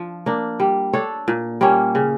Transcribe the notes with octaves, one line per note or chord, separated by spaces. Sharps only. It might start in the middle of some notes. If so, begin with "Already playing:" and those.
Already playing: F3 D4
A#3 D4
G3
D4 A4 C#5
A#2
G3 A#3 C#4
C#3